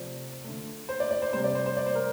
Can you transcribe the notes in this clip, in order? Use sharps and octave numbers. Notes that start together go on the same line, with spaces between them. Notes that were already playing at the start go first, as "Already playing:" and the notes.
Already playing: C3 F3 A3 C5 D5
D3 A3
C5
D5
D5
C5
C3 G3 C5
D5
C5
C5
D5
C5
A#4